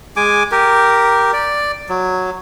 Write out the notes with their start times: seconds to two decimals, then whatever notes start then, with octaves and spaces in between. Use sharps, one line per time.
0.16 G#3 G#5 D6
0.52 G4 A#4
1.33 D5
1.89 F#3